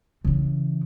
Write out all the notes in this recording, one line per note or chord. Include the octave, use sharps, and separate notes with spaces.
C#3 E3